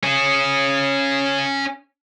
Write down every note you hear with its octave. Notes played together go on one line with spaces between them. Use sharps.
C#4 G#4